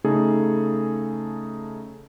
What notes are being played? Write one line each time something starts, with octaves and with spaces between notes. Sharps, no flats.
C#3 A3 D#4 G#4 A4